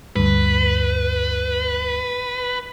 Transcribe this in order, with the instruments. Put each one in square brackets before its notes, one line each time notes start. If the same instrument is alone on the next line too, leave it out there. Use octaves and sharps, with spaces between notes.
[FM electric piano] D2 G2 [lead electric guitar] B4